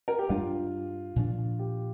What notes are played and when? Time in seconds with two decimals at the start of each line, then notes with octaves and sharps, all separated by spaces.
0.08 A#4
0.19 G4
0.29 G2 G3 D4 F4
1.16 A#2 F3 D4
1.59 G4